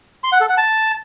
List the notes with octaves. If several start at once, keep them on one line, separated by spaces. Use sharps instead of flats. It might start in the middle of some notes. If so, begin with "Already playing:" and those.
C6
F#5
A4
F#5
A5